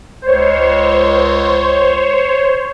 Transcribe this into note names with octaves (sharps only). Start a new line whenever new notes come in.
C#2 C5 C#5